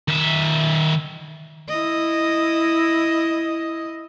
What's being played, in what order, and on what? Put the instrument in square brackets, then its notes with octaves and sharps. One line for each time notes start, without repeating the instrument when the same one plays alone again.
[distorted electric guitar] D#3 E5
[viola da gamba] E4 D#5